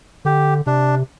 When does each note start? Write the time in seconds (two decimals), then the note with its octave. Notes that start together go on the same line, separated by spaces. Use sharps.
0.25 D3 G4
0.66 C3 D4